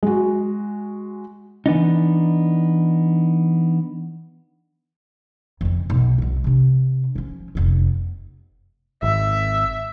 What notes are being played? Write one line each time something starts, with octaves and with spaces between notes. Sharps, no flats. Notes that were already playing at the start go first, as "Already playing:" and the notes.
G#3 F#4
E3 B3 D4 D#4
F2 C#3
B1
C2 F2
C3 D4
F3 C#4
F1 B3
G#1 E5